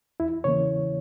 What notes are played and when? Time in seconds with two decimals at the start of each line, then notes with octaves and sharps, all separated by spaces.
0.20 E2 E4
0.44 C#3 E3 A#3 C#5